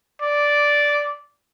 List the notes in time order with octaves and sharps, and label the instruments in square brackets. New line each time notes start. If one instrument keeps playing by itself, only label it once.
[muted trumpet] D5